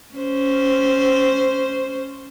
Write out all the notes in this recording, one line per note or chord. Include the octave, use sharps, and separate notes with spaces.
C#4 C5